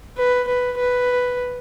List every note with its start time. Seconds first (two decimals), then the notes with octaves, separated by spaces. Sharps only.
0.18 B4
0.47 B4
0.77 B4